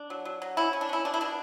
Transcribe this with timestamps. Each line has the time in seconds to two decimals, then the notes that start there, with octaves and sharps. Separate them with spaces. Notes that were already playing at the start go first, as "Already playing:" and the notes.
Already playing: D4
0.10 F#3
0.25 F#3
0.42 F#3
0.57 C#4 E4
0.73 C#4
0.81 D4
0.89 C#4 E4
1.05 B2 D4
1.14 E4
1.21 B2 D4